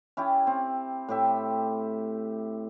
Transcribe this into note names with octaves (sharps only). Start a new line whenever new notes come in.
C#4 E4 G4
C4
A2 G4 E5